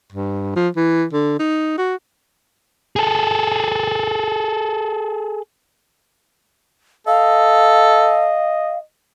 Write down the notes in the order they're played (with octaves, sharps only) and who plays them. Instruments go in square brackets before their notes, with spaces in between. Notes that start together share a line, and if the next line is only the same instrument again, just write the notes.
[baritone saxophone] G2
F3
E3
D3
D#4
F#4
[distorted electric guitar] G#4 A4
[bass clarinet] A4 [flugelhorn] D#5 [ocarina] F5